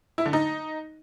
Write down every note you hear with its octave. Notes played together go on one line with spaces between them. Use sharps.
E4
D3
D#4